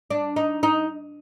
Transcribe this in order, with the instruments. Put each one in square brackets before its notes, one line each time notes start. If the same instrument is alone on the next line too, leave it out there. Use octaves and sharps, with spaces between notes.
[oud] D4
D#4
D#4